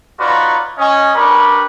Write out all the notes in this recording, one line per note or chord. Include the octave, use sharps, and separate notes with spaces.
D#4 F4 F#4 B4 C#5 D5
C#4 D#5
G3 D4 A#4 B4 C#5 B5